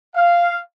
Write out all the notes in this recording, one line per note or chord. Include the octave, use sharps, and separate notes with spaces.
F5